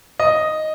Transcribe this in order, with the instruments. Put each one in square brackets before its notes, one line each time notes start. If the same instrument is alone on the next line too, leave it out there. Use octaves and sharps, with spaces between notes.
[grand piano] D#5